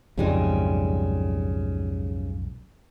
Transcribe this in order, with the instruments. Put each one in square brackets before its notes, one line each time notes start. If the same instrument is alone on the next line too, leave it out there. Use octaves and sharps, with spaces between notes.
[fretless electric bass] B1 F2 G#2 [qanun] C#3 G3 G#3